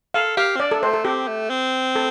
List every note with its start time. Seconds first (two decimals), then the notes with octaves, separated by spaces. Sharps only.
0.14 A4 F5
0.37 G4 F5
0.56 C4
0.60 D4 D5
0.71 A4
0.83 A3 C5
0.94 A4
1.05 C4 G4
1.28 A3
1.50 C4
1.95 A4